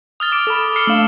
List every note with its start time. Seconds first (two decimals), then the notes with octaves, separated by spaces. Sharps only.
0.20 D#6 F6 A6
0.32 D6 D7
0.47 A4 B5
0.76 F6 C7 C#7
0.87 A3 D4 F5 E6 E7